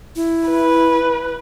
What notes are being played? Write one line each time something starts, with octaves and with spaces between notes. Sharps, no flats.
E4
B4